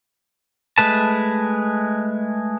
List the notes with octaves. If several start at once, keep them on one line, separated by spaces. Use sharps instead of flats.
G#3 A3 B4 A5